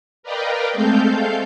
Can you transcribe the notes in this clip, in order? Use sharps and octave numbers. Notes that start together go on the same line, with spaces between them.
A#4 B4 D5 D#5 F5 G5
G#3 A3 C4 A4 F5 G6